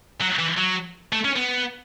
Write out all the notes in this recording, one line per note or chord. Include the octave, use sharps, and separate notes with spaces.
F#3
E3
F#3
A3
C#4
B3